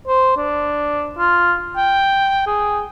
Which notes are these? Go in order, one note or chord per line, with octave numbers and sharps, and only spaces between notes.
C5
D4
F4
G5
G#4